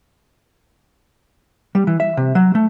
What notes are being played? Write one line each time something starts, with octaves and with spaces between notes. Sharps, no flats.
G3
E3
E5
C3
F#3
A3